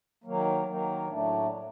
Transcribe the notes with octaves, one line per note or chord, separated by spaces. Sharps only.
D#3 F#3 A#3
D#3 F#3 A#3
A2 F#3 A3 D4